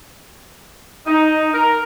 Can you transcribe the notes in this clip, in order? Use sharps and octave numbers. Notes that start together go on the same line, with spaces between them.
D#4
A#4